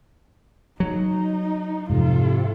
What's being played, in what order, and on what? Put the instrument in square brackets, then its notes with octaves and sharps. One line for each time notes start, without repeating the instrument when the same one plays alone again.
[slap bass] F#3 [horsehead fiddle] D#4
[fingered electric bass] F2 G#2 [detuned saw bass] C3 [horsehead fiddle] F4 A4